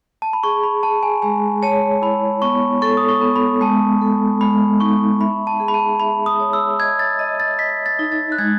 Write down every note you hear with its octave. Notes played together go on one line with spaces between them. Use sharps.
A5
B5
G#4 C#6
B5
G#4 A5
G#5
G#3 G#5
C#5 A5
E4 B5
B3 C#6
A4 C#6
D#6
C#6
B3
B5
G#3 A5
A4
G#3 B5
D#4 C#6
E5 B5
A5
G#4
B5
A5
E5 B5
D#6
C#5
E6
D#5 G#6
A6
D#5
A6
D#5 B6
A6
D#4
A6
F#6
G#3 G#6